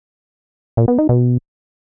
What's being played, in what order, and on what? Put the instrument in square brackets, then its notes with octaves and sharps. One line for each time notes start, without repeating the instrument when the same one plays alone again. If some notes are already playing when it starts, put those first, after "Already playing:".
[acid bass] A#2
B3
D#4
B2